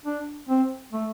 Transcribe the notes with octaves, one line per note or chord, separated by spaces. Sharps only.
D4
C4
A3